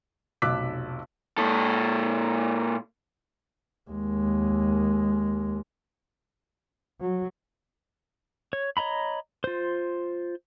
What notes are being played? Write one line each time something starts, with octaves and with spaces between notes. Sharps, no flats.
F1 B1 D6 E6 F#6 B6
A#2 A4
D#2 G#3
F#3
C#5
C#5 D#5 A#5 B5
F4 C5